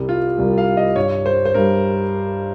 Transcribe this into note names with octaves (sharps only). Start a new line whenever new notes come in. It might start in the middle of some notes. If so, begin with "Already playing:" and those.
Already playing: C2 C3 G3
F4
C2 C3 G3
F5
D#5
G2 G3 C#5
C5
C5
G2 G3 A#4